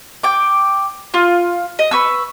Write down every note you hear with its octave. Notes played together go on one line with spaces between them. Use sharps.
G5 D6
F4
D#5
B4 C#6 E6